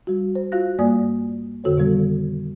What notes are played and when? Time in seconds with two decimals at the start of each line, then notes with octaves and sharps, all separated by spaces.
0.07 G3 F#4
0.35 C5
0.52 F4 F#4 F5 F#6 A#6
0.79 G2 G3 A#3 D5 G#5 D#6
1.64 F2 D3 F#4 A4 C#5
1.77 B2 D#3 G3 B3